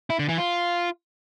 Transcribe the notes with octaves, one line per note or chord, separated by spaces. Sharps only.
E4
D3
E3
F4